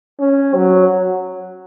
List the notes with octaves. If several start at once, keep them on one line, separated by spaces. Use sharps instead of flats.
C#4
F#3